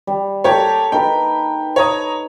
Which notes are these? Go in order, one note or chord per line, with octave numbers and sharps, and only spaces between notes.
G3
G4 A4 A#4 C#5
D#4 A#4 B4 G5
C#5 A#5 D#6